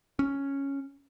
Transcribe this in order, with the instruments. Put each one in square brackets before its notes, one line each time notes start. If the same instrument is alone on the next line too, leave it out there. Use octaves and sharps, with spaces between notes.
[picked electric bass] C#4